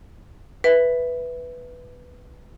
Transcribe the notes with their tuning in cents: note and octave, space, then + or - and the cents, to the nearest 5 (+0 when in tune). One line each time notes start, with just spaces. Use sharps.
B4 +0 E5 +0